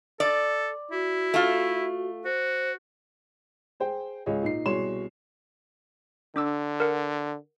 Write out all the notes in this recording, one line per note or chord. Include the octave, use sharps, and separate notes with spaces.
A4 D5
E4 F#4
A3 F4
F#4 C5
G#4 C5 G5
C#2 G#4 C#5 D#5
A#2 D#4 C7
C2 B2 G#4 C#5 C6 E7
D3 D4 D6 E6
A#4 F#5